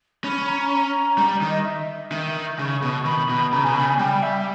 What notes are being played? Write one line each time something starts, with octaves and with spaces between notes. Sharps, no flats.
C#4 B5
A#5
A#5
G3 A#5
D#3
D#5
E5
D#3
C#3 C#6
B2
D#3 B5
B2
C#3 A#5
B2 G#5
C#3 B5
G#5
G3 G5
E5